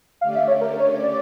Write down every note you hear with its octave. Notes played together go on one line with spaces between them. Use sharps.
D3 A3 C#4 G4 D5 F5
E5
C#5
A#4
C#5
D5